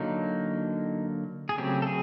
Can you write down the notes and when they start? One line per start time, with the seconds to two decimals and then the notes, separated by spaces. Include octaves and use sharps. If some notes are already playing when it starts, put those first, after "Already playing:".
Already playing: D3 F#3 A#3 D#4
1.49 G#4
1.58 C#3 F#3 A3 C4 G4
1.82 A4
1.87 G#4